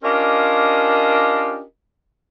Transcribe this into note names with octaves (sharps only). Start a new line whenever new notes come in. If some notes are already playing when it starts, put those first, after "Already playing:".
C#4 D4 F4 G4 A#4 D#5